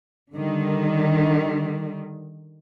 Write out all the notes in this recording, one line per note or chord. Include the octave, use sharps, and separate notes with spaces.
D3 D#3 G3